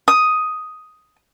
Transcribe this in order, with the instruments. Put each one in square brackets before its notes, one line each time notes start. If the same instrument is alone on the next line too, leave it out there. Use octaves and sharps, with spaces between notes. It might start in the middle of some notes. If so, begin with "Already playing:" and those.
[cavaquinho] D#6